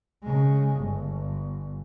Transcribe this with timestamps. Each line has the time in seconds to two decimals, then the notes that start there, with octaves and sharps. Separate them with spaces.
0.23 C#3 G#3
0.76 G1